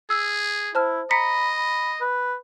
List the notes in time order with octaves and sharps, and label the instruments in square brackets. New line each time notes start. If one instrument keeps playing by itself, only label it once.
[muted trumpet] G#4 [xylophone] E6
[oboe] E4 [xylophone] C5 A5 F6
[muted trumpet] D#5 [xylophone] A#5 B6 C#7 [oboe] B5
[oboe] B5
B4